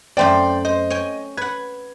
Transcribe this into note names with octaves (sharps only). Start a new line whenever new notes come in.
F#2 A3 C4 D5 G5 C6
C5 D#5
C#5 G5 G#5
B4 F#5 G#6